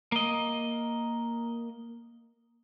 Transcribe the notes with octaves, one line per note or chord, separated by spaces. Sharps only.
A#3 D#5